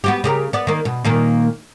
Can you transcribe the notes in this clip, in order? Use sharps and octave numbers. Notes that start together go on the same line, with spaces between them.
B3 F#4 G4
C#3 G4 A#4
B3 D5
D#3 A#3
B2
A#2 D#3 A#3